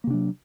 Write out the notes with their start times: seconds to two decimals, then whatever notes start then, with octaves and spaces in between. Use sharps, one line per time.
0.04 A#3
0.07 C3
0.10 D4
0.14 F#3